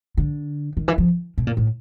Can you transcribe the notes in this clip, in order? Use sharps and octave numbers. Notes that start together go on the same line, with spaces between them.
D3
D#3
E3
F3
B2
A#2
A2